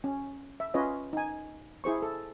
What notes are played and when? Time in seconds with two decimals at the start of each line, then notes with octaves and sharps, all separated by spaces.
0.04 C#4
0.60 E5
0.74 C#4 F4 B4 C#5 D#5
1.13 D#4 G#5
1.84 E4 G#4 C5 C#6
2.02 A4